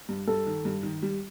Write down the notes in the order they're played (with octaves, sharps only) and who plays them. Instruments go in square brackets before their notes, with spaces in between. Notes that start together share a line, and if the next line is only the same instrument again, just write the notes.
[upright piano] G2
[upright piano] G2 [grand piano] A4
[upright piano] D#3
G2
D#3
G3